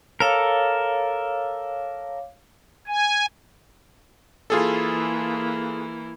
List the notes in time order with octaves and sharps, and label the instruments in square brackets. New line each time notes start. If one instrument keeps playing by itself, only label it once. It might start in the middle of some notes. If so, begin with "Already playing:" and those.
[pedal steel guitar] A4 A#4 [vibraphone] C#5 F5 D6
[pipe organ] G#5
[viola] E3 A#3 [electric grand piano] F4 G#4 A4